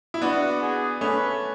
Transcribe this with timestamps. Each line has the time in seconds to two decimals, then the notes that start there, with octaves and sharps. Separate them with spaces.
0.14 E4
0.21 B3 D4 F#4
0.62 G#4
1.01 A3 C#4 B4